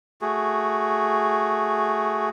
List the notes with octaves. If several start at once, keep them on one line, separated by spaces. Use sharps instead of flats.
A3 F#4 G#4